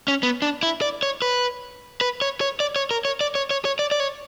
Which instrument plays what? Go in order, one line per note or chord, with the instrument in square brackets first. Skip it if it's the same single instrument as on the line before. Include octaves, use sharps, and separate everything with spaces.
[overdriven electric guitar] C#4
B3
D4
E4
D5
C#5
B4
B4
C#5
C#5
D5
C#5
A#4
C#5
D5
C#5
C#5
C#5
D5
D5
C#5